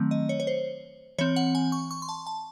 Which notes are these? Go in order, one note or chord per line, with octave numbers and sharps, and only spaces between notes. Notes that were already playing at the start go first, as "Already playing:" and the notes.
Already playing: D#3 F#3 A3 C4
D#5
C#5
C#5
C5
E3 C4 C#5
F#5
G#5
C#6
C#6
C6
A5
A5